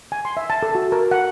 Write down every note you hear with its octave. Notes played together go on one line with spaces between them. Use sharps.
G#5
C6
E5
A5
A4
F#4
A#4
F#5